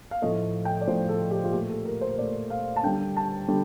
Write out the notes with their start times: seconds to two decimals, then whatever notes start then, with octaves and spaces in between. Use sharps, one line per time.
0.11 F5
0.22 A2 F3 A3 D#5
0.65 G5
0.81 D5
0.87 A2 F3 A3 C5
1.09 A4
1.22 A4
1.31 G4
1.44 F4
1.52 A#2 G4
1.56 A3
1.69 A4
1.85 A#4
2.01 C5
2.17 A#2 A3 D5
2.50 F5
2.76 A5
2.83 D3 G3 G5
3.16 A5
3.48 D3 G3